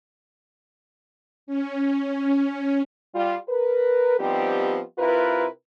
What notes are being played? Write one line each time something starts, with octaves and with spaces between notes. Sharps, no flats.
C#4
G3 F4
A#4 B4
F3 G3 B3 C4 D#4 G4
C3 E4 F4 A#4 B4